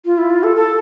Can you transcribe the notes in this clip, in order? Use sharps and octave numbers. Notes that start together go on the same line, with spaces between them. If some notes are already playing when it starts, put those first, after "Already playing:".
F4
E4
F4
A4
A4